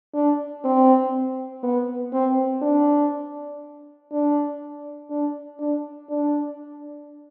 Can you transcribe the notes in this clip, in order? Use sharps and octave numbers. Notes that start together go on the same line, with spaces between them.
D4
C4
B3
C4
D4
D4
D4
D4
D4